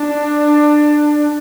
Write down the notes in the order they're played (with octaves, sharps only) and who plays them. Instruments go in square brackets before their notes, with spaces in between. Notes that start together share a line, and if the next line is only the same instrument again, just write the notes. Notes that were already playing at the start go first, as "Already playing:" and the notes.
Already playing: [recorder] D4